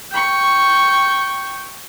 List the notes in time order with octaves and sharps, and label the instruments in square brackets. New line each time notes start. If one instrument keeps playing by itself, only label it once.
[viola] G5 C#6